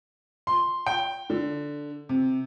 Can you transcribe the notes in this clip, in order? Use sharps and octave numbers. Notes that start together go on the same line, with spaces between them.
C6
G5
D3
C3